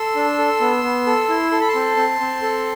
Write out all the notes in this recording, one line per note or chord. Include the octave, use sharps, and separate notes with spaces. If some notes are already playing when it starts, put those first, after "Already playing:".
Already playing: A4 C6 E6
D4
A4
B3
B3
A4
E4
A4 C6
B5
A5 C6
C4
C4
C4
A4